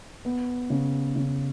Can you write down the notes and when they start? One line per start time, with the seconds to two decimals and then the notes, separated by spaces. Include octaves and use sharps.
0.25 B3
0.70 C#3
1.16 C#3